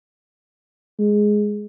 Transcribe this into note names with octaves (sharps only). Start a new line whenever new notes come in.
G#3